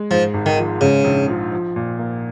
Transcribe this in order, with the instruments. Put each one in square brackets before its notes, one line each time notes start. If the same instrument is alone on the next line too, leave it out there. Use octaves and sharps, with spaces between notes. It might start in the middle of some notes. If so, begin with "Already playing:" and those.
Already playing: [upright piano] G#3
[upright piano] G#2 [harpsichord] F3
[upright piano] G#1
[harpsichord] D#3
[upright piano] F3
[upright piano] G#2 [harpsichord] C#3
[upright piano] A#1
F3
F3
A#2
A#3